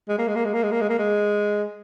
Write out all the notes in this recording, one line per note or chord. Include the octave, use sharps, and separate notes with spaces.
G#3
A#3
G#3
A#3
G#3
A#3
G#3
A#3
G#3
A#3
G#3